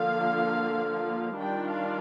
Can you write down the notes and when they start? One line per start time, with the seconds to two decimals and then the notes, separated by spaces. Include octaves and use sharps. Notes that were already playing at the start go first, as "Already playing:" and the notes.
Already playing: D3 F3 A#3 F5
1.38 D#3 G3 D4 F4 G5
1.70 F5